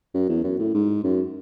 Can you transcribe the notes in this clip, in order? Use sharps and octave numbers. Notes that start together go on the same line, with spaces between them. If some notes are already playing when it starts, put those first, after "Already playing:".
F#2
E2
F#2
A2
G#2
F#2